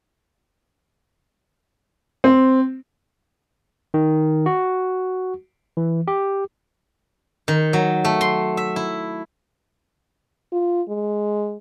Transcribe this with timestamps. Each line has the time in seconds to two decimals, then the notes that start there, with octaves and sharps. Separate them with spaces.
2.24 C4
3.94 D#3
4.46 F#4
5.77 E3
6.08 G4
7.48 D#3
7.73 F#3
8.05 A3
8.21 C6
8.57 E5
8.76 E4
10.52 F4
10.89 G#3